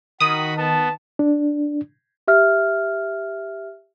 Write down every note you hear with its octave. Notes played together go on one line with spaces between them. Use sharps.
D#3 F#4 B5 D#6
B3 A5
D4
G4 E5 F6